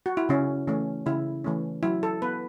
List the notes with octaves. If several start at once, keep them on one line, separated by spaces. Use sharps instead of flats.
F#4
E4
C#3 C#4
E3 A3 C#4
C#3 E4
E3 A3 C#4
F#3 E4
A4
B3 B4